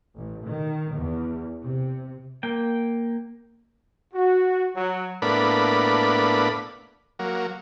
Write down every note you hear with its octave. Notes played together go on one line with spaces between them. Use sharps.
A1
D#3
E2
C3
A#3 G5
F#4
F#3
A2 A#3 B3 D4 B5
F#3 A#3